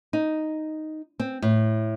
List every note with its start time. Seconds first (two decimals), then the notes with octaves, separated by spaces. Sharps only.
0.13 D#4
1.20 C4
1.42 A2